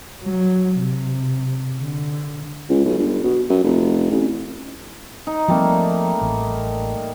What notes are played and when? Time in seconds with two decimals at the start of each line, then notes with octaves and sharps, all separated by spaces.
0.23 F#3
0.80 C3
1.81 D3
2.69 C#2
2.85 B1
2.98 G1
3.24 B2
3.50 F#2
3.64 F1
4.11 A1
5.27 D#4
5.48 F3 G3 A3 A#3 C4
6.21 A1